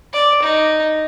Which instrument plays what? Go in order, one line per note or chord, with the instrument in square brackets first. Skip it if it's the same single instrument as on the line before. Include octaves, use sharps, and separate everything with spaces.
[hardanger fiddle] D5
D#4